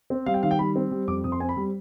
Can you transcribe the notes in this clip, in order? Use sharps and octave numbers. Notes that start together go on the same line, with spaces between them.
C4
G3 F5
G5
D#3 F5
G5
G3 B5
C4
G3
F2 D6
F2 D#6
C6
C4 G#5
B5
G3